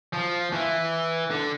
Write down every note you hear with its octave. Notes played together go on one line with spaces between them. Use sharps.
F3
E3
D3